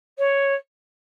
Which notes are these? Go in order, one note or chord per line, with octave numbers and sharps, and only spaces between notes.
C#5